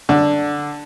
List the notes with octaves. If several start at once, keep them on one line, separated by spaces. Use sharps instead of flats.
D3